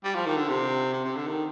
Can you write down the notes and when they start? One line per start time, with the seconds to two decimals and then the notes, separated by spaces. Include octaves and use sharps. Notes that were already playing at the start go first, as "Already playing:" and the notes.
0.04 G3
0.15 F3
0.26 D#3
0.37 D3
0.49 C3
0.93 C3
1.04 C3
1.16 D3
1.27 D#3